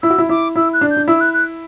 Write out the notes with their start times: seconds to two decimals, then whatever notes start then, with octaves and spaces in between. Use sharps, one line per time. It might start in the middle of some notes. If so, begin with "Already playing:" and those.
0.02 E4 E6
0.10 F#4
0.18 E4
0.29 E4 D6
0.56 E4 E6
0.73 F#6
0.81 D4
0.90 G6
0.97 D4
1.08 E4 E6
1.20 F#6
1.33 F#6